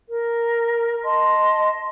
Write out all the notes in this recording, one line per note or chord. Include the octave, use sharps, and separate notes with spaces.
A#4
D#5 A5 C6